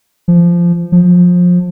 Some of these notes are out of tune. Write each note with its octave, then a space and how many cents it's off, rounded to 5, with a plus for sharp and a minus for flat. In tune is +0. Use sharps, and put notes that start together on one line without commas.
F3 -15
F3 +25